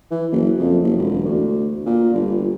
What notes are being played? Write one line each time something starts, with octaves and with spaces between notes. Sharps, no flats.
E3
F#1
F2
F#1
E1
D2
A#2
G1